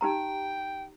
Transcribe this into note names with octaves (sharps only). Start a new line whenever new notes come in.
D#4 G4 G5 A#5